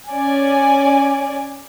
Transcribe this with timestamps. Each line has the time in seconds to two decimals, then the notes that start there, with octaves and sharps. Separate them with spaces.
0.10 C#4 D5 G#5